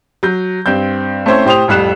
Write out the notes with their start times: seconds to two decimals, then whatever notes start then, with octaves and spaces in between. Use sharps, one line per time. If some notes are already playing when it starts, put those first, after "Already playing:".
0.23 F#3 G6
0.66 G2 C4 G6
1.26 A3 C4 C#4 E4 C5 C#5
1.45 A2 G4 C5 D#6 F7
1.68 A1 F2 G3 F#6 E7